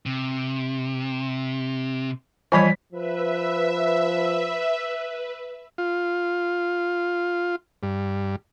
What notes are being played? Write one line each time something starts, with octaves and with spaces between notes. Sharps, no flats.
C3
E3 F3 G3 C#5 D#5 G#5 B5 B6
F3 B4 E5
F4
G2